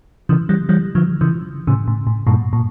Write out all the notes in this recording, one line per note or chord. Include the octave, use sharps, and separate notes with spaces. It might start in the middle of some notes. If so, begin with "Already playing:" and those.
C#3 E3
E3 G3
E3 G3
D3 F3
C#3 E3
A2 C#3
A2
A2
G2 A#2
A#2